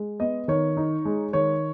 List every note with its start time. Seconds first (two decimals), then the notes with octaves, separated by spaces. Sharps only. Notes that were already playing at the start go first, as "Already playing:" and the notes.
Already playing: G#3
0.20 B3 D#5
0.48 D#3 C#5
0.77 D#4
1.05 G#3
1.33 D#3 C#5